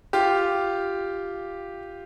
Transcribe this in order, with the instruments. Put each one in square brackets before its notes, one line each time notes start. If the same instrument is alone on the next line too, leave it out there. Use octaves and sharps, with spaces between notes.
[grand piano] F4 G4